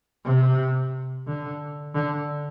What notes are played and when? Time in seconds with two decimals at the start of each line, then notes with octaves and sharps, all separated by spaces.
0.25 C3
1.27 D3
1.95 D3